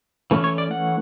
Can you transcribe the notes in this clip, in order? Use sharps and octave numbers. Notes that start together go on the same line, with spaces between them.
E3 A3 C#4
C#5
D5
F#5